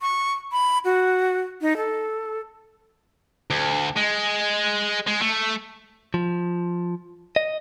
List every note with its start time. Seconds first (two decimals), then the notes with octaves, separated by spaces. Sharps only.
0.01 C#6
0.52 B5
0.85 F#4
1.61 D#4
1.77 A4
3.50 D2
3.97 G#3
5.07 G#3
5.22 A3
6.14 F3
7.36 D#5